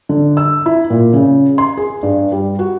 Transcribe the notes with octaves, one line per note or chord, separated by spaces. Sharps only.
D3
E6
E4
A#2
C#3
C6
G#4
G2
G3
F#4